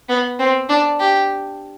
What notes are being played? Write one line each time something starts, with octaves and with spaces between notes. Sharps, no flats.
B3
C4
D4
G4